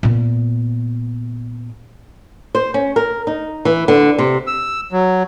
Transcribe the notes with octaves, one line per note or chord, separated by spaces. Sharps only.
A#2 B3
C5
C#4
A#4
D#4
E3
D3
C3
E6
F#3